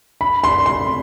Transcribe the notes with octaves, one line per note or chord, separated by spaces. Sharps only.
B5
C6
C6